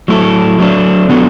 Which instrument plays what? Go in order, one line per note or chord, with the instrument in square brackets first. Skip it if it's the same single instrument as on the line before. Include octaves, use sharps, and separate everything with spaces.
[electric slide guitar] F#3 A3 E4 A4
F#3 A3 D4
D3 F#3 B3 D4 A4